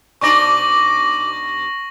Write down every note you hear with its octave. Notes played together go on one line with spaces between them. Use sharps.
B2 D4 D#4 C#6 D6 A#6 F#7